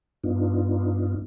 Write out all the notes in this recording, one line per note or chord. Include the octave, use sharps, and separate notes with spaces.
G2 B3 D4 D#4 F4